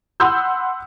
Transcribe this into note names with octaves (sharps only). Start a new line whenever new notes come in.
F#5 B5 C6 D#6 E6 G6